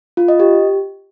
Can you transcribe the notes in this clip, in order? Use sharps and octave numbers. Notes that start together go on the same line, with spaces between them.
F4
D#5
G4